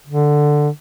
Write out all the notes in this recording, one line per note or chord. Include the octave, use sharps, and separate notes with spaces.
D3